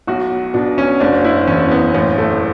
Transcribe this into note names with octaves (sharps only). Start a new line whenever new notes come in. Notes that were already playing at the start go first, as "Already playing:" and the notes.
B1 F#4
B2 D4
C#4
F#1 D4
E4
E2 C#4
B3
A1
A3